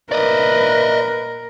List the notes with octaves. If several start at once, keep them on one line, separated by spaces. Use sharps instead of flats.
A#2 A#4 B4 D5 D#5